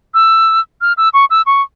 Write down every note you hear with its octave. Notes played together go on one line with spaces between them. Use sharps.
E6
F6
E6
C#6
E6
C#6